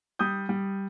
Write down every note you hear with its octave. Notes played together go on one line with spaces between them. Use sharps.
G3 D#6 G6
G3